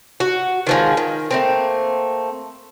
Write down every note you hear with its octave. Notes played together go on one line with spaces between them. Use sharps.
F#4
D#3 F3 G#3
D#3
A3 A#3 C4